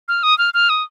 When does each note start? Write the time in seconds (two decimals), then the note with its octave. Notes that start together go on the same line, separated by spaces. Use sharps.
0.08 F6
0.23 D#6
0.38 F6
0.54 F6
0.69 D#6